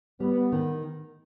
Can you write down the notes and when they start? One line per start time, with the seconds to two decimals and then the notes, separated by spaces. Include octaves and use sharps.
0.20 G3 B3
0.52 D#3